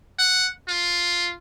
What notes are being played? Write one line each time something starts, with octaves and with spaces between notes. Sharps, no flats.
F#5
F4